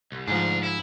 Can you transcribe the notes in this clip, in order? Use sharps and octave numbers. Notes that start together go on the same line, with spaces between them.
C2
D2 G#2 F3 D4
E4